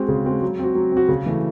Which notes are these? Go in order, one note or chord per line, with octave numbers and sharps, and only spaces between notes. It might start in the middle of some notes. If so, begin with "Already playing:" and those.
Already playing: G#3 C4 F#4
C#3
G#3 C4 F#4
F#3
C4 F#4
F#3
C4 F#4
C#3
E3 A3